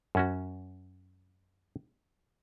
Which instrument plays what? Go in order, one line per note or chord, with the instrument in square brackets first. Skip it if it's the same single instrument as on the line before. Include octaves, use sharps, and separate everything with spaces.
[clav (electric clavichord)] F#2 C#4 F#4